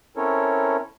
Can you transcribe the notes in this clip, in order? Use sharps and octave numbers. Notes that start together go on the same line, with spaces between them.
C4 C#4 E4 A4 A#4 C#5